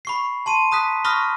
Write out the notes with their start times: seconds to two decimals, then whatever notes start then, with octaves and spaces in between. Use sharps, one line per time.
0.05 B5 C#6 C7
0.46 A5 C6 D#7
0.71 A#5 D#6 F#6 B6
1.05 B5 C#6 D#6 F6 F#6 A#6